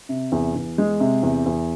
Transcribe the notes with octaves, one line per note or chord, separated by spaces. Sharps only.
C3
E2
E2
G#3
C3
E2
E2